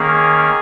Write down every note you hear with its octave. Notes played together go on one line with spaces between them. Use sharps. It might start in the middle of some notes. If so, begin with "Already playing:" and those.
Already playing: D#3 A#3 C#4 G#4